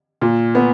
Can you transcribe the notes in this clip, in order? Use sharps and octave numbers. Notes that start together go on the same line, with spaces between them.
A#2
B3